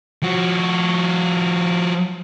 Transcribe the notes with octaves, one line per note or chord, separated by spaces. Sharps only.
F3 F#4